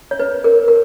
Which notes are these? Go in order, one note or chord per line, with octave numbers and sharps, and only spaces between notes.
C#5
B4
A#4
A#4